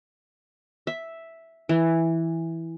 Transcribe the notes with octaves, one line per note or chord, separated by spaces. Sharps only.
E5
E3